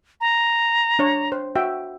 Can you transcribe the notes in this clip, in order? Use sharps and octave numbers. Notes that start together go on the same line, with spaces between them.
A#5
D4 C#5
C5
F#4 E5 G5